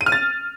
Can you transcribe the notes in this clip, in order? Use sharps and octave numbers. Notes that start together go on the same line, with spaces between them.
D#7
F6
A6